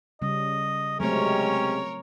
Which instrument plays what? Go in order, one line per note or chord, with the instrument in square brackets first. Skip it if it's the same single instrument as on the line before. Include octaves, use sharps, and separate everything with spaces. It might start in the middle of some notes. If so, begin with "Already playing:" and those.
[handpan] C#3 G3 C#4 [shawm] D#5
[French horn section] C3 G#3 [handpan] F#3 A3 C4 [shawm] C#4 [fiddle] A#4 C#5